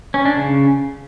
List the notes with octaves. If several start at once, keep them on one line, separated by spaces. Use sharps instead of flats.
C#4
D4
C#3